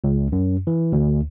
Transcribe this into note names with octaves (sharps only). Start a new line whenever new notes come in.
C#2
F#2
E3
D2